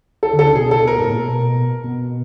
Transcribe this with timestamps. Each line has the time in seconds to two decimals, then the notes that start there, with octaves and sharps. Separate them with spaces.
0.23 A4
0.33 D3
0.39 A4
0.45 C#3
0.55 B2 G#4
0.71 A4
0.87 A#4
0.97 G#2
1.04 A2
1.12 A#2
1.19 B2
1.84 B2